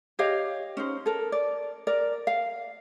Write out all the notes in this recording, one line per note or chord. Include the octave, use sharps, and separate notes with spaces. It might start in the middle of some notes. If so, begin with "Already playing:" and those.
G4 C#5 D#5 F5
C#4 D#4 C5
A4 A#4
D5
A#4 D5
F5